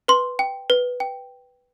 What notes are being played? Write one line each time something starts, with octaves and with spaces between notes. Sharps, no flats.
B4 C6
G5
B4
G5